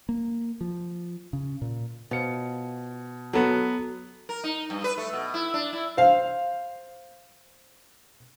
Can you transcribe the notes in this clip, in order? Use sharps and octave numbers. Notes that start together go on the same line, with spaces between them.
A#3
F3
C#3
A#2
B2 F4 C5 C#7
F#3 B3 F#4 A4
A#4
D#4
G2
B4
A3
B2
E4
D4
E4
C5 F5